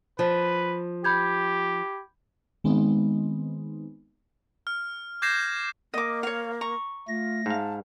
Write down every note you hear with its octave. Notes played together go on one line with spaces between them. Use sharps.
F3 B4
G4 B5 G6 G#6
D#3 G#3 B3 C4 D#4
F6
D6 G6 G#6 A#6 C7 E7
A#3 D#5 D6
C#5 F5
A#5 C#6
A3 F4 A#6
G#2 F5 A5